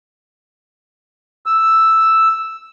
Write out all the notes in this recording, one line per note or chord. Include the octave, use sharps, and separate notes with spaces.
E6